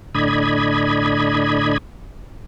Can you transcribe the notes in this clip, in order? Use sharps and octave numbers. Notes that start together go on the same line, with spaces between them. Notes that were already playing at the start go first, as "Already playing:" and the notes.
A2 D3 D4 D#5 B5 G#6